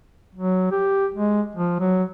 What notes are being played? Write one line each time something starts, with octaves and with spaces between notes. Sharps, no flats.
F#3
G4
G#3
F3
F#3